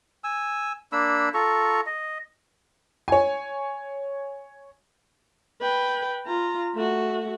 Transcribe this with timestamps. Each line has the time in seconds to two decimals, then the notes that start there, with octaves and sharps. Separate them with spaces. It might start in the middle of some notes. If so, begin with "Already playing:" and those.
0.24 G#5 E6
0.92 A#3 D4 B5 E6
1.34 F4 A4 A#5 C#6
1.86 D#5
3.08 C#5 G#5
5.61 B4 G5
6.26 F4 A#5
6.75 A3 F#4